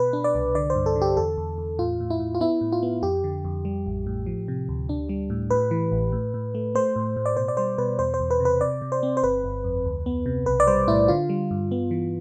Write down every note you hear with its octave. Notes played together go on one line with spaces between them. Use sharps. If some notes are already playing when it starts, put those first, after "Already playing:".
Already playing: B2 B4
D4
D5
C2
D3 D5
C5
G2
A4
D3
G4
E2 A4
E2
E2
A2 F4
A2
E4
A2
F4
B3 E4
A2
F4
B3
F2 G4
D3
F2
G3
A1
A2
F3
C3
D2
D4
G3
A2
A2 B4
E3
A1
A2
A2
A3
A3 C5
A2
A2
D5
B2 C5
D5
G3 C5
B2 B4
E2 C5
C5
E2
B4
C3
B4
C3 D5
C3
C5
C4
C5
G1 B4
G1
F2
D2
B3
C3
B1 B4
D5
G3 C5
A2 E4
D3 F4
G3
G2
B3
E3